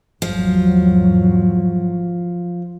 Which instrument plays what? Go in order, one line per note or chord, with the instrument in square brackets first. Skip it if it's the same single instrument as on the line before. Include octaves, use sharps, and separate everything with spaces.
[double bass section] G#1 E2 F#3 [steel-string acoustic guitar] F3